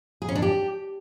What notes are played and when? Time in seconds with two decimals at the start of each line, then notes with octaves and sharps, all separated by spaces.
0.22 G#4
0.29 C#4
0.35 D4
0.42 G4